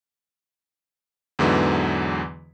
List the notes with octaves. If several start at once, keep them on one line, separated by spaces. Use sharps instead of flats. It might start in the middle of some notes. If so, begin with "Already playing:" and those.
E2 G#2 D3 E3 F#3